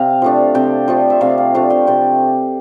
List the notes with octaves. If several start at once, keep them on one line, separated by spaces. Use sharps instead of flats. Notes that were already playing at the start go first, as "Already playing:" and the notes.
Already playing: C3 F5
F3 A3 D4
C3 G5
F3 A3 D4
E5
C3 F5
F5
F3 A3 D4 F5
G5
C3 G5